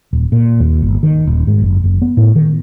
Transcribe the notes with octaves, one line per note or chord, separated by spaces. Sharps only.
D#1
A#2
D#2
G1
D#3
D#1
G#2
F#1
F#1
B3
A2
D#3